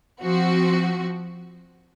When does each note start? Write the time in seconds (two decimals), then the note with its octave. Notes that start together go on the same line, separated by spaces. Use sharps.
0.22 F3 C4 F#4